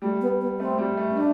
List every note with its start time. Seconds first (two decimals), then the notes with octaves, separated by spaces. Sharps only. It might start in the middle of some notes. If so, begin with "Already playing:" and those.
0.02 G3 A3
0.21 B3
0.41 B3
0.59 A3 C4
0.78 G3
0.97 A3
1.11 C4
1.17 A3 D4